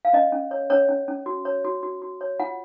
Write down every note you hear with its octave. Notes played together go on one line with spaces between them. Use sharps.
F5
C#4 D#5
C#4
C#5
C#4 C#5
C#4
C#4
F#4
C#5
F#4
F#4
F#4
C#5
F4 F#5